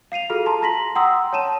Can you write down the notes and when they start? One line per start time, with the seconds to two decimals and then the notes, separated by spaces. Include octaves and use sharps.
0.12 F5 C7 D#7 F7
0.30 F4 F#4 G#4 A4 F6
0.46 A5 A#5 C6
0.62 A#5 A#6 B6 F#7
0.96 F#5 G5 A#5 C6 D#6 E6
1.33 C#5 A5 D#7 E7